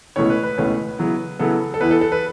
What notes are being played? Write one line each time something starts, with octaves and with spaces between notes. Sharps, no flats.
C#2 B2 A3 C#4 E4 C#5
B4
B4
C#2 B2 A3 C#4 E4
C#3 F#3 B3 E4
C#3 F#3 B3 E4 A4
A4
E2 E3 B3 E4 B4
A4
A4
B4